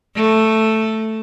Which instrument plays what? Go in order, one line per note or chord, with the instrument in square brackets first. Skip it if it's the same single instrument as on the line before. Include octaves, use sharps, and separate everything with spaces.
[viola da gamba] A3